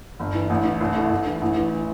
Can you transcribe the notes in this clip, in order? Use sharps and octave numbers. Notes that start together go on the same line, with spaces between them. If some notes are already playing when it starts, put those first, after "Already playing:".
G1
E3
A1
E3
C2
A3
A1
E3
A1
E3